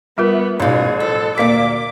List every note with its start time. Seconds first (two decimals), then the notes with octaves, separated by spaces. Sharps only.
0.18 G3 B3 F4 A#4 E5
0.60 A1 F#2 B2 D#4 G#4 F5
1.00 F3 A4
1.38 D2 A#2 A#3 D6 B6